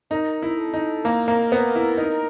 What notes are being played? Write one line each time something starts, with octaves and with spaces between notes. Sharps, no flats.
D#4 A#4
E4
A4
D#4
A#3 A#4
A#3
B3
E4
D#4